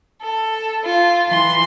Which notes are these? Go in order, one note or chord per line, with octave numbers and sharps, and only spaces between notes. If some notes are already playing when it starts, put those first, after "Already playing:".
A4
F4
E3 C6